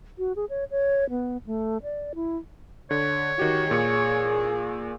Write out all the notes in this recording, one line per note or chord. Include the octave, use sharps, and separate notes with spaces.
F#4
G#4
C#5
C#5
B3
A3
D5
E4
D3 C#5
D#3 F#4 G4
A#2 G#4 C#6 C#7